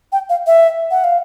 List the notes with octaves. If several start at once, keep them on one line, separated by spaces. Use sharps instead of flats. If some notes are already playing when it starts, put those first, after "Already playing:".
G5
F5
E5
F#5
F5